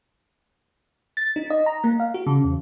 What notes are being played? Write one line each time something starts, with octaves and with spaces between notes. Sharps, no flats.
A6
D#4
D#5
A#5
A#3
F5
F#4
C#3
E2